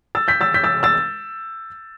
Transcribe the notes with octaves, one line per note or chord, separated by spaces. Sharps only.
E6 A6
G6 B6
E6 A6
G6 B6
E6 A6
E6 A6